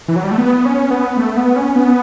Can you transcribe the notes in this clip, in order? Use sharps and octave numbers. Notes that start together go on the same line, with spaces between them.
E3
F#3
G3
A3
B3
C#4
B3
B3
A3
B3
C#4
B3